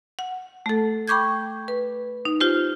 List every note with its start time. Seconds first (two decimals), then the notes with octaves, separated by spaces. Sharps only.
0.19 F#5
0.66 A3 A4
1.08 G5 B5 C#6 D6 G6 G#6
1.68 B4
2.25 D#4
2.41 F4 G4 C5